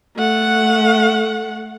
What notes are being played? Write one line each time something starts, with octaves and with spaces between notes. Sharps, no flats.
A3 F#5